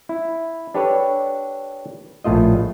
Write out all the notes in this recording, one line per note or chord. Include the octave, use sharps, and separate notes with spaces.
E4
D4 G4 A4 B4 C#5
A#1 A2 A3 F4 D#5